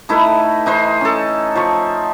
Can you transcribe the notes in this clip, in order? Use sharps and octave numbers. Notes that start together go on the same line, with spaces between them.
A3 D#4 E4 B4
E3 D#4 C5
C#4 A4
F3 C#6